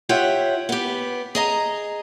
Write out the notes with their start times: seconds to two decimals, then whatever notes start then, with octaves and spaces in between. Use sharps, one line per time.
0.09 F4 G4 C#5 E5 F#5
0.69 B3 G4
1.35 G#4 D#5 A#5